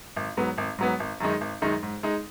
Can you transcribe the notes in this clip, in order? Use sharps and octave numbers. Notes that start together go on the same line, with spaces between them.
G#1
G#2 F#3 B3
G#1
G#2 F#3 B3
G#1
F#2 D#3 G#3 D#4
G#1
F#2 D#3 G#3 D#4
G#2
G#3 D#4